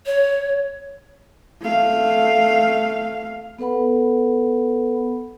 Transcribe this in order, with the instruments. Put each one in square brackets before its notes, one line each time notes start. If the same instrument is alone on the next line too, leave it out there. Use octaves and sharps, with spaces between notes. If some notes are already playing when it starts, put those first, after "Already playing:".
[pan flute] C#5
[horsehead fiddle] A3 F5
[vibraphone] B3 A4 B4 F#5 B5